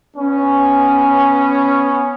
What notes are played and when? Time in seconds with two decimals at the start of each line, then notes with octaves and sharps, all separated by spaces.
0.17 B3 C#4